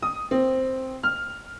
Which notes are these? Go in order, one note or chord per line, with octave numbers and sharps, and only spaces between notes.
D#6
C4
F6